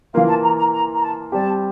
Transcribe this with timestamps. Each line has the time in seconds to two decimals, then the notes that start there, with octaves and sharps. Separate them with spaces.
0.14 E3 A#3 F4 F5
0.28 A5
0.43 A#5
0.57 A#5
0.73 A#5
0.94 A#5
1.02 A5
1.32 G3 C4 G4 A5